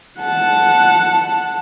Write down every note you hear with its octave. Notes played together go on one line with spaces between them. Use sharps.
F#5 A5